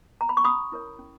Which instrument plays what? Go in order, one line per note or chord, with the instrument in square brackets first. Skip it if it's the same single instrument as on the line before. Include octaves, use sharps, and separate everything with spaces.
[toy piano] A#5
B5
C#6
C#4 B5 D#6
E4 A#4 C#5
C#4